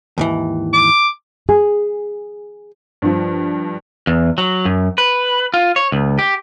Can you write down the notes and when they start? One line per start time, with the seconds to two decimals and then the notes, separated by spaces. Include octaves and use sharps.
0.18 D#2 G#2 E3
0.73 D6
1.49 G#4
3.02 G2 F3
4.07 E2
4.38 F#3
4.65 F#2
4.98 B4
5.54 F4
5.76 C#5
5.92 C#2
6.19 G4